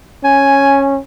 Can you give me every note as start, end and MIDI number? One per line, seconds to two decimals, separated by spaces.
0.24 1.00 61
0.24 0.86 80